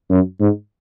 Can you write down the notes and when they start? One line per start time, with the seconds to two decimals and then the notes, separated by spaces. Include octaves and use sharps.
0.10 F#2
0.40 G#2